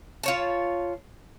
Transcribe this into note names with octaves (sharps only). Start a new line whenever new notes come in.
F4 C#5 A5